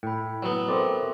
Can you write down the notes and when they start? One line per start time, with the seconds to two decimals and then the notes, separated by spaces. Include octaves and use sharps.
0.03 A2 G5 B5
0.43 F#3 B3 B4
0.68 C4 A4 A#4 D5 E5